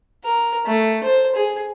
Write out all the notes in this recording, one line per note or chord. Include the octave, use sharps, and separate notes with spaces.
A#4
A3
C5
G#4